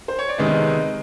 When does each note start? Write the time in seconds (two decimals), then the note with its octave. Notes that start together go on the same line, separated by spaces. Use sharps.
0.08 C5
0.19 C#5
0.29 D5
0.38 C3 D#3 G#3 B3 D#5